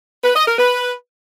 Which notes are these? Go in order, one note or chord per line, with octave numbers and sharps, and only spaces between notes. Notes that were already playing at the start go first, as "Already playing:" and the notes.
B4
D#5
A#4
B4